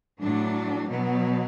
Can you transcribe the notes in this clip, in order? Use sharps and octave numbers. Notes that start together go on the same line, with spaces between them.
A2 F#3 D4
B2 F#3 B3